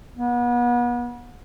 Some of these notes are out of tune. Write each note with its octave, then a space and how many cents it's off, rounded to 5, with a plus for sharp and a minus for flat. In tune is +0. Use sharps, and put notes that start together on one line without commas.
B3 -35